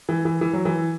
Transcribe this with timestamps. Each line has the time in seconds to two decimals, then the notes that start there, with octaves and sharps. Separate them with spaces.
0.09 E3
0.25 E3
0.41 E3
0.53 F#3
0.65 E3